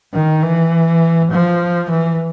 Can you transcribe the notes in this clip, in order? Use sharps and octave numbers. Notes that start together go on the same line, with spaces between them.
D#3
E3
F3
E3